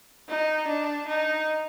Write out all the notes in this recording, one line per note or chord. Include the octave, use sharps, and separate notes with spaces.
D#4
D4
D#4